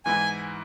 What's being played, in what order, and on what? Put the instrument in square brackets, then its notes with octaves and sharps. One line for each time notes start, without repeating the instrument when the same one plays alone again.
[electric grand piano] G#2 E3 B3 E4 [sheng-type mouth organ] G#5